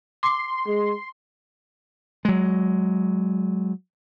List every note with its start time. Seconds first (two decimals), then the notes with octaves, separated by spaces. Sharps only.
0.23 C6 D6
0.67 G#3
2.25 F#3 G#3